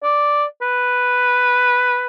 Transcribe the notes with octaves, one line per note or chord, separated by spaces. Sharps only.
D5
B4